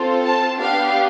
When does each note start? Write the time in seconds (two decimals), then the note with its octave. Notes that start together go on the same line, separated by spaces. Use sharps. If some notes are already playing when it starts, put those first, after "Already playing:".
Already playing: C4 F4 A4
0.23 A5
0.60 B3 D4 G4 F5